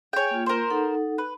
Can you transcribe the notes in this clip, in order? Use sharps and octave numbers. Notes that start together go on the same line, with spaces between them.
G#4 C#5 G5 G#5
A#3 F4
A#4 C5
D#4 A4 F#5
B4